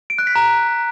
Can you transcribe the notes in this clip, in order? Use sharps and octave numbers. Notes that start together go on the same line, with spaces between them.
D7
F#6
B6
A#5